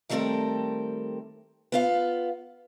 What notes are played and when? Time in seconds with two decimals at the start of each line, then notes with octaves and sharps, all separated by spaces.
0.09 D#3 G3 A3 C4 A4 A#4
1.72 B3 F4 F5